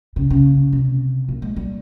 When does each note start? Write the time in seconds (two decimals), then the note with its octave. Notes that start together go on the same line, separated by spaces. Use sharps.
0.16 C#3
0.30 C#3
0.73 C3
1.28 A#2
1.42 G#3
1.56 G3